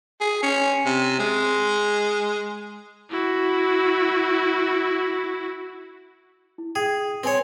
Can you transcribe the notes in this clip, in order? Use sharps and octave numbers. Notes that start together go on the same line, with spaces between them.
G#4
C#4
C3
G#3
E4 F#4
E4
G#4 G5 D#6
C4 B4 C#5 G#5 C6